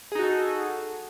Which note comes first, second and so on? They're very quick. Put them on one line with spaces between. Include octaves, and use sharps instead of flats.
G#4 D#4 F#4 A4